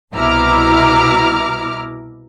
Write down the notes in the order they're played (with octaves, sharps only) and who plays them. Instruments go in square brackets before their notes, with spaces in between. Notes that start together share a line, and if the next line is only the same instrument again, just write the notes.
[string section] C2 B2 E4 A#5 D6 F6